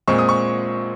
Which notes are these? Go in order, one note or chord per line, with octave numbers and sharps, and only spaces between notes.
A#2 G#3 C4 C#6
D#6
C#6